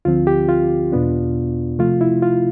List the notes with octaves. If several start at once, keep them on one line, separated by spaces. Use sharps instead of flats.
D2 D3 F3 C4 F4
G4
F4
E2 B2 B3 D4
C3 F3 A3 F4
E4
F4